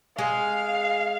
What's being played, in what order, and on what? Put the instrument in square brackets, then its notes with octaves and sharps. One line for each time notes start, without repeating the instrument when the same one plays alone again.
[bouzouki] G#3 [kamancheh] F5